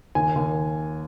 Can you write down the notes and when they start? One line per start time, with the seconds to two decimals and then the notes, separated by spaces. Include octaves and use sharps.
0.15 D#2 G#5
0.35 D#2